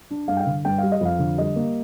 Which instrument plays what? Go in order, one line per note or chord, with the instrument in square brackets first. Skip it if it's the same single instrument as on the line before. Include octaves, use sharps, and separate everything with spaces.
[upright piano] D4
G2 F5
G5
F5
D3
G2 G5
G3 F5
D#5
F2 F5
D3
G3 D#5
A#3